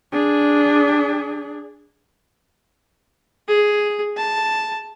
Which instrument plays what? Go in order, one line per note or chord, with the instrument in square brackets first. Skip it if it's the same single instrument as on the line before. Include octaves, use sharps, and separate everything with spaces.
[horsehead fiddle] D4 G#4
[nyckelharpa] G#4
A5